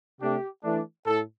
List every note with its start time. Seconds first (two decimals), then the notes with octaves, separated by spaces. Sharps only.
0.21 C3 A3 D4 G4
0.64 E3 A3 D4
1.07 A2 A4